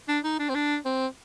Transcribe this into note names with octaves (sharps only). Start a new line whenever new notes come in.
D4
D#4
D4
C4
D4
C4